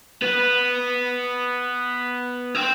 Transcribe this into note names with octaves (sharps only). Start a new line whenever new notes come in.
B3
C4